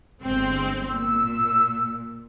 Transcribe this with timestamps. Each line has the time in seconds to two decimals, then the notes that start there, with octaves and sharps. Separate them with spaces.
0.22 G1 G#3 C4
0.89 A#2 E6